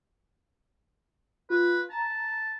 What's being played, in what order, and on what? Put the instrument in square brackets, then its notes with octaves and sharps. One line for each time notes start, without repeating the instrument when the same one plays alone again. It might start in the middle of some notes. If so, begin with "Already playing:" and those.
[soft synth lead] F4 [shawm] B4
[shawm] A5 [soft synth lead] A#5